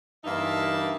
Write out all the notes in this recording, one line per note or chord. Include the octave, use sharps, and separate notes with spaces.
G2 E3 A#3 D#4 E5 A5